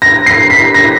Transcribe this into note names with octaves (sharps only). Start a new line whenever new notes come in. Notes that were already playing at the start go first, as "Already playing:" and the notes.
A#6
C7
B6
A#6